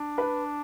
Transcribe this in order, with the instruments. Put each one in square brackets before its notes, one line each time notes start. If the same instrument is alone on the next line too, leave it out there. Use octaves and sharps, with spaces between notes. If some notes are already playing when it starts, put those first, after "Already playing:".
Already playing: [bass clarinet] D4
[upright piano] B4